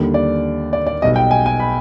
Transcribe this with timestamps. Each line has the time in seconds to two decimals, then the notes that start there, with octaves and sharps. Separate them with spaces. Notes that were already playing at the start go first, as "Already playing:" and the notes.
Already playing: D#2 D3 G3
0.14 D5
0.73 D5
0.87 D5
1.02 B1 B2 G3 D#5
1.16 G5
1.31 G#5
1.46 G#5
1.60 B5